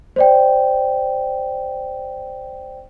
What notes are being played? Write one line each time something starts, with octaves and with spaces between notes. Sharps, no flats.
C5 D5 G5